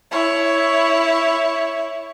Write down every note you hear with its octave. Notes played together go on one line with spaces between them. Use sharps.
E4 C#5